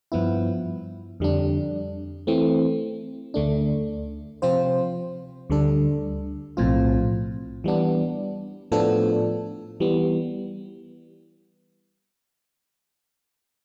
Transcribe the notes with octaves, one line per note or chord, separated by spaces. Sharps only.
G2 F3 B3 E4
F2 D3 G3 D4
E3 A3 C4
D2 D3 A3 D4
C3 F3 C4 F4 C5
D2 D3 G3 D4 A4
B1 A2 F3 C4 F4
E3 G3 B3 D4
A2 F3 B3 D4 A4
E3 G3 B3